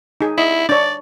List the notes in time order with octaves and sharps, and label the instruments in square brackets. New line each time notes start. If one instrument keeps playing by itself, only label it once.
[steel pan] D#4 G#4
[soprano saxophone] E4 [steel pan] D#5
[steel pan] D4 C#5 [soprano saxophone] D5